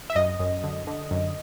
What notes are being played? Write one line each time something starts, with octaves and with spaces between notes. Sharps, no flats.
E5
F#2 D#5
F#2
D3
D3
F#2